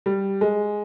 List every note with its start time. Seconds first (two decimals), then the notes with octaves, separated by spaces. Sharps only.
0.06 G3
0.41 G#3